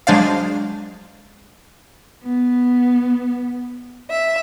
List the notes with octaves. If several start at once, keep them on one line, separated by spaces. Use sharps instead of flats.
F#3 G#3 D4 C5 D5 F5
B3
E5